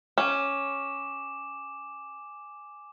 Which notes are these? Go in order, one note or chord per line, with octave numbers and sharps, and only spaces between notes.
C#4 G#5 D6 E7